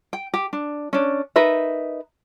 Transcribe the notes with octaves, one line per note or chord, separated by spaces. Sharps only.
G5
G4
D4
C#4 D4
D#4 A#4 B4 E5